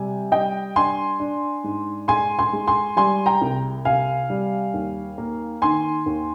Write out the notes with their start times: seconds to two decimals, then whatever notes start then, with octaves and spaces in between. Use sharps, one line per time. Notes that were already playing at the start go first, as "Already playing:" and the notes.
Already playing: C3 G3 G#5
0.32 G3 D#5 G5
0.76 D4 G#5 C6
1.20 D4
1.64 G#2
2.08 G#3 G#5 C6
2.39 G#5 C6
2.53 G#3
2.67 G#5 C6
2.96 G3 G#5 C6
3.26 G5 A#5
3.41 C2
3.85 C3 F5 G#5
4.30 G3
4.74 D#2
5.18 A#3
5.62 D#3 G#5 C6
6.06 D#2